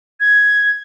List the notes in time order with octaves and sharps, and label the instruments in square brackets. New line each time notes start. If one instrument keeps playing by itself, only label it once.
[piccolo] G#6